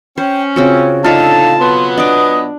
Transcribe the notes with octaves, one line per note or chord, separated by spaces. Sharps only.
C#4 C5 G5
C#3 C4 F4 F#4
A2 D3 D#4 F4 A4 F5 A5
B2 F#3 B3 C6
D4 D#5 D6 D#6